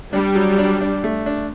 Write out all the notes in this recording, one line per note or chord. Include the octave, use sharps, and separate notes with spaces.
G3 D4
F#3
D4
D4
A3
D4